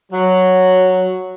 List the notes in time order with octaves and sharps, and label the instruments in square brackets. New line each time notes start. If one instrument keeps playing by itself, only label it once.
[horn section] F#3